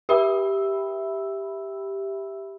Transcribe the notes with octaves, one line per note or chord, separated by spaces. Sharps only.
G4 E5 G5 B5 E6